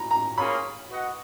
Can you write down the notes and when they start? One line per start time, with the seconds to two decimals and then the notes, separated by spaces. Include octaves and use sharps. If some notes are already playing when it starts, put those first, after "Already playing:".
Already playing: A#5 B5
0.11 A#5
0.37 A#3 C#4 F4 G#4 C#5 B5
0.90 F#4 B4 D#5 F#5